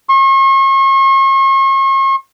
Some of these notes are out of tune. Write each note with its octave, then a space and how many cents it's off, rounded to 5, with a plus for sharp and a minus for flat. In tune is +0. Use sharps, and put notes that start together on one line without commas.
C#6 -40